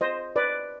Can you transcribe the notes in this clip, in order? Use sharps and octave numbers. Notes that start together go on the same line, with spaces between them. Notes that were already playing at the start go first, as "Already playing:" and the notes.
C5 D#5
B4 D5